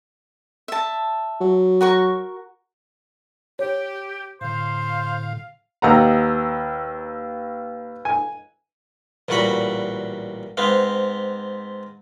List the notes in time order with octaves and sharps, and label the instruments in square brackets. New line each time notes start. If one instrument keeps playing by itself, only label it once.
[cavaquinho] E5 A5
[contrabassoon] F#3
[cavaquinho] F#4 A#4 C#6
[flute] G4 [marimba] C#5
[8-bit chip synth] A2 D3 [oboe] C5 [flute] F5
[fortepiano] D#2 F#5 A#5 [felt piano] B4 F5 E6
[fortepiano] G#5
[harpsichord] A1 A#2 G3 F#4 F#5 B5
G#2 B3 C4 F5